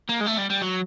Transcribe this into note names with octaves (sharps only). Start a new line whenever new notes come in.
A#3
G#3
A3
G3
G3
F#3